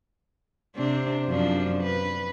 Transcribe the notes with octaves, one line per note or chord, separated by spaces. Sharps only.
C3 C4 D4
F#2 F3 D4
B4